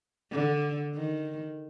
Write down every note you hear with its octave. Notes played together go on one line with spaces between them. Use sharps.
D3
D#3